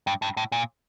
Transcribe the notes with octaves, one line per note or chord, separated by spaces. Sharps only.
G2
G2
A2
A#2